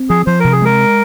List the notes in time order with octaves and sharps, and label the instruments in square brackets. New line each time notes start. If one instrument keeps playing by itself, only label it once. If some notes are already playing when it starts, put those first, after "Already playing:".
Already playing: [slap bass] C4
[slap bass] F3 [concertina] G#4
[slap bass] F3 [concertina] C5
[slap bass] C3 [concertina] A#4
[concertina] G#4
[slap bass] G#3 [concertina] A#4